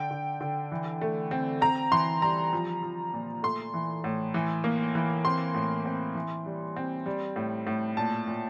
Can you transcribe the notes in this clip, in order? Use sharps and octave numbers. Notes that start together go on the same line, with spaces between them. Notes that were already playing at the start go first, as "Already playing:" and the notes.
Already playing: D3 G5
D3
D3
E3
A3
C4
C4 A#5
E3 C6
G3 A#5
F3
F3
A#2
A3 C6
E3
A2
E3
A#3
E3
C4 C6
A2
C4
E3
G3
C4
G3
A2
A2
A#2 A5
A#2